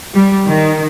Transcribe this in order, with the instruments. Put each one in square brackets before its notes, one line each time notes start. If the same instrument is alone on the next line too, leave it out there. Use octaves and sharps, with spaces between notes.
[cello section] G3
D#3